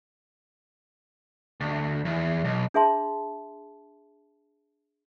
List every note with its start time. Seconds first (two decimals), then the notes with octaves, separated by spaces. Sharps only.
1.60 D2
2.05 E2
2.44 B1
2.74 D4 G#4 E5 A5 C6